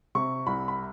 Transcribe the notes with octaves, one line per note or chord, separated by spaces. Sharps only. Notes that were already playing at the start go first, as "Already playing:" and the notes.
C3 C#6
C2 B5
B5